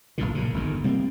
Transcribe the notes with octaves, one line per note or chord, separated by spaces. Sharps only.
F1 C2 A#2 D3
A#1 F#2 C#3
G1 F2 D#3
C3 G3 A#3 C4